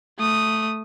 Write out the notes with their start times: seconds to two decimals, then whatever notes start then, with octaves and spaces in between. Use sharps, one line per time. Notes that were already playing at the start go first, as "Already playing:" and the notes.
0.19 A3 D#6